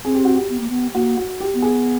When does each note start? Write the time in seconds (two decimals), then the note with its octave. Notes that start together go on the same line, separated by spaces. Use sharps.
0.05 C4 G#4
0.14 G4
0.25 F#4
0.35 G4
0.50 B3
0.60 A#3
0.70 B3
0.94 A#3 F#4
1.17 F#4
1.40 G4
1.54 B3
1.62 G#4